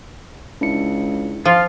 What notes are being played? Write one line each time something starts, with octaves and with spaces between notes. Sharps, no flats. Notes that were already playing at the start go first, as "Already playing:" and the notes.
C#2 D4 E4 C#7
F3 F4